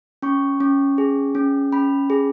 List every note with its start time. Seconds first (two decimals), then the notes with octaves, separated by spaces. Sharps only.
0.22 C#4 C#6
0.60 C#4
0.98 G#4
1.35 C#4
1.72 C#4 B5
2.10 G#4